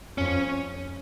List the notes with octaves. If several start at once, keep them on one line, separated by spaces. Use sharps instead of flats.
F2 C#4